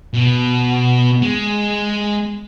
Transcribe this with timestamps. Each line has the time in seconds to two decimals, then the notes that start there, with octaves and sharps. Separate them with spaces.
0.14 B2
1.22 G#3